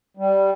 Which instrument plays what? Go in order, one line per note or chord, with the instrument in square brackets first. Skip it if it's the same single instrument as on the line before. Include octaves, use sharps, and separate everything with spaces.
[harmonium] G3